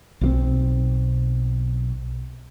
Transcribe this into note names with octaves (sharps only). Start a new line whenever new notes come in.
B1 F3 C4